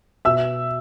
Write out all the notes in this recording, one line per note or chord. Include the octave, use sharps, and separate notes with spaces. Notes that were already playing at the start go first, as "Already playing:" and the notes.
B2 E5 E6